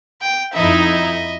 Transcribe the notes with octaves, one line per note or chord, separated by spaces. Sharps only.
G5
F2 D#4 E4 D#5 E5